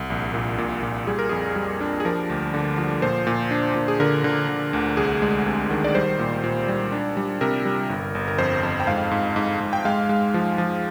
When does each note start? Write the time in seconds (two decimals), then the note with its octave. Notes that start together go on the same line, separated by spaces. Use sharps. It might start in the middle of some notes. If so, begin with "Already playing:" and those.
Already playing: C2
0.10 A#1
0.34 A#2
0.58 A#2
0.83 A#2
1.07 G3 G#4
1.19 A#4
1.29 F2 G#4
1.56 G3
1.80 D4
2.00 G#4
2.05 F3 A#4
2.30 D2
2.54 D3
2.78 F3
3.02 A#2 C5
3.27 A#2
3.51 D4
3.75 A#2
3.88 G#4
4.00 D3 A#4
4.24 D3
4.48 D3
4.73 D2
4.97 C2 G#4
5.22 G#3
5.46 C3
5.71 D#3
5.84 D5
5.95 G3 C5
6.19 A#2
6.44 A#2
6.68 G3
6.92 D4
7.17 G3
7.41 C3 A#4
7.65 G3
7.90 G1
8.15 G1
8.28 A#4
8.38 F2 C5
8.63 F2
8.80 G5
8.87 G#2 F5
9.11 G#2
9.36 G#2
9.60 G#2
9.73 G5
9.85 G#3 F5
10.09 G#3
10.34 F3
10.58 F3